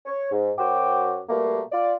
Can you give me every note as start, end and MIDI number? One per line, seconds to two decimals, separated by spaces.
0.06 0.31 73
0.32 0.52 44
0.59 1.20 42
0.59 1.20 66
0.59 1.20 72
0.59 1.20 79
0.59 1.20 86
1.29 1.61 47
1.29 1.61 55
1.29 1.61 57
1.29 1.61 58
1.72 1.95 65
1.72 1.95 74